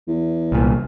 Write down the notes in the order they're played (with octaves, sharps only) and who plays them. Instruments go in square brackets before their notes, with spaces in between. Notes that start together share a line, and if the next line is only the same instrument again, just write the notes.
[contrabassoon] E2
[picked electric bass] C2 A#2